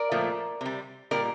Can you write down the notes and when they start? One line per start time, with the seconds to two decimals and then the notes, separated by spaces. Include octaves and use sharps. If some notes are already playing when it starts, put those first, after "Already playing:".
Already playing: A#4 D5
0.11 A#2 F3 A3
0.61 C3 G3
1.11 A#2 G3 A#4 D5